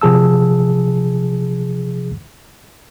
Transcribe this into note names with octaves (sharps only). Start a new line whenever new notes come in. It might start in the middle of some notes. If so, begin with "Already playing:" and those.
C3 F3 G#4 A5 E6